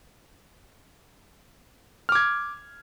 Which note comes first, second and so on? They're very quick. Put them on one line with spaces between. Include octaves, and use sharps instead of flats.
F6 D6 G#6